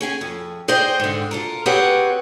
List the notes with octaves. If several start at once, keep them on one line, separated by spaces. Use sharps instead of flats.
C#4 G#4 G5 G#5
F2
G#4 C5 D5 D#5 G5
G#2 D3
F4 A4 A#4
C4 G4 G#4 B4 C#5 F#5